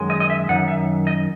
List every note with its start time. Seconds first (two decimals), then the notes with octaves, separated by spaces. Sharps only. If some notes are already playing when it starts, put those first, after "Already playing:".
Already playing: F#2 D#3 G#3
0.10 D#5
0.20 D#5
0.30 E5
0.49 F#2 D#3 F#5
0.68 E5
1.07 D#5